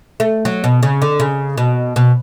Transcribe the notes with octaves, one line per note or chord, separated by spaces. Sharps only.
A3
F#3
B2
C#3
D3
C#3
B2
B2